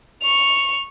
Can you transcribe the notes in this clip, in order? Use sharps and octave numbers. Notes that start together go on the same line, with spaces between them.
C#6 F7